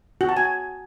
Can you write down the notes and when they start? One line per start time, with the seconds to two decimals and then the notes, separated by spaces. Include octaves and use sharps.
0.21 F#4
0.29 A5
0.37 G#5